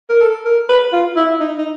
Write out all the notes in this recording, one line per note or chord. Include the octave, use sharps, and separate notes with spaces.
A#4
A4
A#4
B4
F4
E4
D#4
D#4